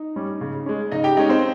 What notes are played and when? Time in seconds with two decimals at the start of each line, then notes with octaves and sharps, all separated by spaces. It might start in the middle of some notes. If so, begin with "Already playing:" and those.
Already playing: D#4
0.16 G3 C#4
0.41 C#3
0.66 G#3 C#4
0.91 C#3 D#4 D#5
1.04 G4 G5
1.17 G#3 C#4 D#4 D#5
1.29 C4 C5